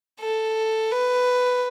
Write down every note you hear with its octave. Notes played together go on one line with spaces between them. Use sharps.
A4
B4